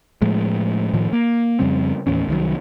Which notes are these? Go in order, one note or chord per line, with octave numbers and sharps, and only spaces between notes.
A2 F3 G#3
A2 D#3 F3
A#3
F2 C#3 G3 C4
D#2 A2 E3 C#4
C2 D#3 F#3